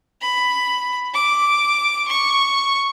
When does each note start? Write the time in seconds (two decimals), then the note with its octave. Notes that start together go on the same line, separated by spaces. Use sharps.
0.22 B5
1.14 D6
2.08 C#6